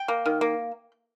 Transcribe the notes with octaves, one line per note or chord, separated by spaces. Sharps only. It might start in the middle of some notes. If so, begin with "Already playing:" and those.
Already playing: G5
A#3
D#3
A#3